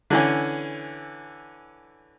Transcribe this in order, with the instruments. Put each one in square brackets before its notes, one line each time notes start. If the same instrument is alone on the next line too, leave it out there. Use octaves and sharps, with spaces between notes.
[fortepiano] D3 E3 C#4